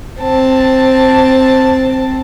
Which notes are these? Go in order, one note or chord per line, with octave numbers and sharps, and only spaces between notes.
C4 A5